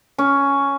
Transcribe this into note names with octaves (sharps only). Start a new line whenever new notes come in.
C#4